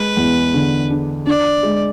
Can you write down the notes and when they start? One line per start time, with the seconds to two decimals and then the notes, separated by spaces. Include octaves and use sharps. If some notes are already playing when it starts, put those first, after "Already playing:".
Already playing: G#3 B4
0.17 E2
0.54 D3
0.90 D4
1.26 D4 D5
1.63 G#3